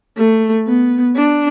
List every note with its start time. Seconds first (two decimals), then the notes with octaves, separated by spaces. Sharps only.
0.17 A3
0.66 B3
1.16 D4